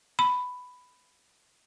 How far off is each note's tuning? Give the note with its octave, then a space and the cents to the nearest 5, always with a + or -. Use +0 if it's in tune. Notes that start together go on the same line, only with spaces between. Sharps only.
B5 +10